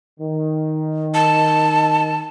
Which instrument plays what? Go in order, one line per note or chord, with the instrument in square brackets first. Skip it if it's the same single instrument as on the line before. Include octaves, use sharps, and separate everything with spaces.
[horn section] D#3
[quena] A5